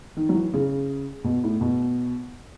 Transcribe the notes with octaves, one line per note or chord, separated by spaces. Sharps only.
D#3
F#3
E3
C#3
B2
A2
B2